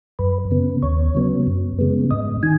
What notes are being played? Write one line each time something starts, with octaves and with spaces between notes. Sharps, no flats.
F#2 B4
C#3 B3
D#2 C#5
C#3 F#3 B3
F#2
C#3 G#3 B3
G#2 D#5
D#3 G#5